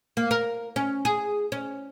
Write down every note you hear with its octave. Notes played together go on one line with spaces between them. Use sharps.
A#3
A#4
C#4
G#4
C#4